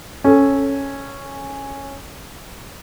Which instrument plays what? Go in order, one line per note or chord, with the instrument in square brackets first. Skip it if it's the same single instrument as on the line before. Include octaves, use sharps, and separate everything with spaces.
[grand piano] C#4 A4